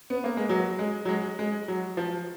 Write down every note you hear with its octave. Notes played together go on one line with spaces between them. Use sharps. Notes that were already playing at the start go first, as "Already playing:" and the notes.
B3
A#3
G#3
F#3
G#3
F#3
G#3
G#3
F#3
F3